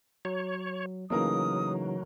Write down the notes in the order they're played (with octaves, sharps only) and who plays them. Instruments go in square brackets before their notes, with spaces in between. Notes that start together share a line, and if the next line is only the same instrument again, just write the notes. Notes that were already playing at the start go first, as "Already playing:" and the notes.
[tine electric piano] F#3 [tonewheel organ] C#5
[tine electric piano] C#3 E3 D#4 [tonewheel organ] F#3 [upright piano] A3 A#3 A#4 [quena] D#6